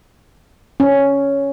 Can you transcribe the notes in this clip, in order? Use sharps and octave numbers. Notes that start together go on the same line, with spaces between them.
C#4